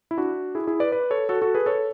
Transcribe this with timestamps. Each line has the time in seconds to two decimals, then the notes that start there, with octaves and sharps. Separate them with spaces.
0.11 E4
0.17 D4 F#4
0.55 E4 G#4
0.67 E4 G#4
0.80 B4 D5
0.92 B4 D5
1.11 A4 C#5
1.29 F#4 A4
1.42 F#4 A4
1.55 G#4 B4
1.66 A4 C#5